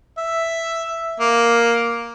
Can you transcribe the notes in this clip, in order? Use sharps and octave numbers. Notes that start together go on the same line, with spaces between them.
E5
A#3